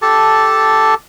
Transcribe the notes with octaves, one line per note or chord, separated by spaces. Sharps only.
G4 A4 A5